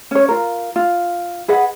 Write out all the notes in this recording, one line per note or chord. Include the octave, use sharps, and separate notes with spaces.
C#4 C#5
F4 A#4
F4
G#4 B4 D#5 F#5